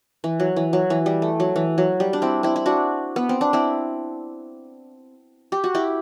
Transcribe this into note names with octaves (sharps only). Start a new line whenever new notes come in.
E3
F#3
E3
F#3
E3
G3
A3
F#3
E3
F#3
G3
D4
C4 E4
C4 E4
E4
D4 F#4
B3
C4
D4
C4 E4
G4
F#4
E4 G4